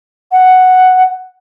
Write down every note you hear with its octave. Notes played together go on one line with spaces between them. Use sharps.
F#5